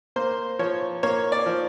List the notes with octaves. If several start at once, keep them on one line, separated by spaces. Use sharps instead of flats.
A#3 C5
F3 C#5
A#3 C#5
D5
F3